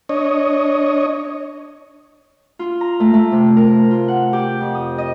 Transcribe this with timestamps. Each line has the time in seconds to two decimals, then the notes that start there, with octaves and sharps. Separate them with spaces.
0.09 D4 C#5 D#5
2.59 F4
2.81 A#5
3.00 A3
3.14 A3
3.32 C3
3.57 A#4
3.91 F4
4.08 F#5
4.33 G4
4.61 F2
4.75 D#6
4.98 D#5